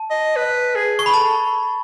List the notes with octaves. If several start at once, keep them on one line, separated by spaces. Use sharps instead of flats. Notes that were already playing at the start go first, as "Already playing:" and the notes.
Already playing: A5
D#5
B4
G#4
C#6
B5
A4 A5